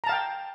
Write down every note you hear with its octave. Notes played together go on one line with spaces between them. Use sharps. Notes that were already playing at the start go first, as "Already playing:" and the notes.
F5 G5 A5 A#5